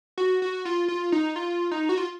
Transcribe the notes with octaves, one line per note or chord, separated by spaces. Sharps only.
F#4
F#4
F4
F4
D#4
F4
D#4
F#4
F4